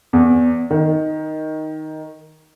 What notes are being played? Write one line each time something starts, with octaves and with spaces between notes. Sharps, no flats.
E2
D#3